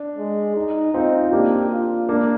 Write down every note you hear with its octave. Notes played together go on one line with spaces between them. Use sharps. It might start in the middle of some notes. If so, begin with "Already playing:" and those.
Already playing: D4
G#3
D#4
C4 D#4 F4
A#3 D4 G4
F4
A#3 D4